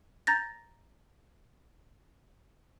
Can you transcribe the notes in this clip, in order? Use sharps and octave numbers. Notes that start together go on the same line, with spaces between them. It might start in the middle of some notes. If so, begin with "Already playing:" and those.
A#5 G6 A6 A#6